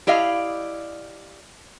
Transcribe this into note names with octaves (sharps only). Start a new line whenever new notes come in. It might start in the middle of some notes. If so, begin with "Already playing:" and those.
E4 G4 D5 D#5 F5